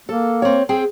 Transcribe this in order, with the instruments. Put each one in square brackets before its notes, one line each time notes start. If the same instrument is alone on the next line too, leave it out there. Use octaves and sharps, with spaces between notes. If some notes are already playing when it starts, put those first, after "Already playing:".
[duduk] A#3 [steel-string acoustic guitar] A4
[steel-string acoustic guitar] C4 C#5
C4 G#4 G5